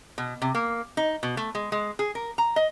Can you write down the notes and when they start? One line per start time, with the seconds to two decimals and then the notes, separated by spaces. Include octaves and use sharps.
0.18 B2
0.42 C3
0.55 A#3
0.97 D#4
1.23 B2
1.37 A3
1.55 G#3
1.72 G#3
1.99 G#4
2.15 A#4
2.38 A#5
2.56 D#5